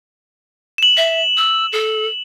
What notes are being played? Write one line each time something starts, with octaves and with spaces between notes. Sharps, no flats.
E7 F#7
E5
E6
A4